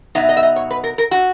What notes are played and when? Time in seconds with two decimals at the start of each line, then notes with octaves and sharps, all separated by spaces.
0.15 B2 F#3 B3 D#4 E5
0.29 D#5
0.37 E5
0.43 D#5
0.56 C#5
0.71 B4
0.84 A#4
0.98 A#4
1.11 F#4